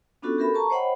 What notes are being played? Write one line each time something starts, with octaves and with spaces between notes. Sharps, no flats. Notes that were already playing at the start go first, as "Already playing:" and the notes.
B3 C#4 D4 F4 F#4 A4
F#4 G4 A4 A#4 E5 B5
A5 A#5 C#6
C5 C#5 D#5 F#5 G5 B5